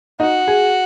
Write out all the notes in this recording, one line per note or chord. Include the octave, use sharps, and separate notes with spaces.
D#4 F#4
G#4